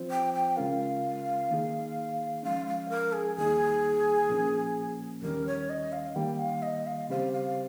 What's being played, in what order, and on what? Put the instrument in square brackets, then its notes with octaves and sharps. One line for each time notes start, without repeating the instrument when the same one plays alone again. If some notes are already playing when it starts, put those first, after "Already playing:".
Already playing: [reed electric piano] F3 C4 F4 C5
[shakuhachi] G5
G5
[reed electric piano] C#3 G#3 C#4 F4 A#4 [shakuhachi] F5
[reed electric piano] D#3 A#3 D#4 G#4
[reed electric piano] F3 G#3 C#4 [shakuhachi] F5
[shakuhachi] F5
A#4
G#4
[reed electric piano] D#2 D#3 G3 A#3 D#4 [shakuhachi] G#4
[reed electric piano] A#2 F3 A#3 C#4
[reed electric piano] D#2 D#3 G3 C#4 [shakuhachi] A#4
[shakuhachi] C#5
D#5
F5
[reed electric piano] D#3 G3 A#3 [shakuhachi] G5
[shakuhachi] F5
D#5
F5
[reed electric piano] C#3 G3 C4 G4 C5 [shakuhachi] F5
[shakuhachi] F5